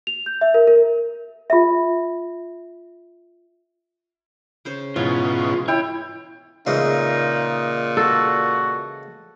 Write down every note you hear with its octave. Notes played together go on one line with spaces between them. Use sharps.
F7
G6
E5
A#4
A#4
F4 E5
C#3 C5 C#5
G#2 B2 E3 C#4 F4
E4 C#5 G5
A#2 C#3 E3 G#3 D#4
F#4 A4